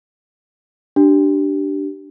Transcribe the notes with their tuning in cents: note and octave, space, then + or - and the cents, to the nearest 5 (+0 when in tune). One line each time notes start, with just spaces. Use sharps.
D4 +0 G4 -20